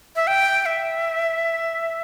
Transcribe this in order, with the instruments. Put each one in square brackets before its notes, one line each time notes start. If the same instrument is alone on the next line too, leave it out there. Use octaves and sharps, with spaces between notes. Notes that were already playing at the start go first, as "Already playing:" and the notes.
[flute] E5
G5
E5